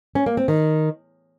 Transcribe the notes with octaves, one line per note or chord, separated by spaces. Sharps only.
C#4
A#3
C4
D#3